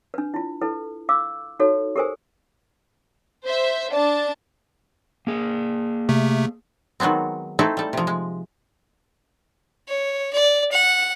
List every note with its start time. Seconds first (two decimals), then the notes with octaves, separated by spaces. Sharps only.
0.14 D4 B4
0.34 E4 F4
0.61 E4 A4 B4
1.09 F5 D6 E6
1.59 D#4 F#4 A4 C#5
1.96 G4 A4 A#4 C5 G#5
3.45 C5 E5
3.93 D4 D5 A5
5.27 A#3 G#4
6.09 C3 A3
7.00 D#3 F#3 G#3 B3 C4
7.59 A3 C4 D#4 E4 A4
7.77 G3 A4
7.93 C3 F3
8.07 G#3
9.88 C#5
10.33 D5
10.72 F#5